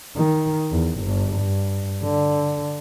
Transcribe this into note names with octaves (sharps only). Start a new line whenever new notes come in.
D#3
E2
G1
G2
D3